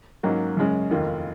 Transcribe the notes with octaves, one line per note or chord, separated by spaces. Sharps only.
G#2 F#3 A#3 C#4
F#2 C#3 G#3 C#4
F1 D#2 D#3 A#3 F4